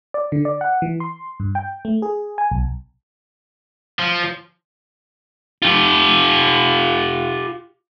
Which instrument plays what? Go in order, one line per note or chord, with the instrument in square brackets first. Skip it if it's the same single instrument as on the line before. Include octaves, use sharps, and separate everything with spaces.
[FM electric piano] D5
D3
D5
F#5
E3
C6
G2
G5
A3
G#4
G#5
B1
[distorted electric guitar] F3
[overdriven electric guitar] F4 G4